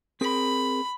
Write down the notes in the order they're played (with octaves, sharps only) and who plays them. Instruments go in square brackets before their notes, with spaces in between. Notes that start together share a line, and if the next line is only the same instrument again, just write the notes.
[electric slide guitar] C4 G#4 A#4 [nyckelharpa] B5